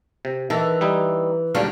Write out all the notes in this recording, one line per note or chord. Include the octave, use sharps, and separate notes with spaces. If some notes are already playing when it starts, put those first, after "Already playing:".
C3
D#3 E3 A4
G3 D#4 E4
D#2 D3 F#3 G3 D4 F5